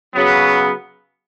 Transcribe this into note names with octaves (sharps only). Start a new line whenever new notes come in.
C#3 F#3 B3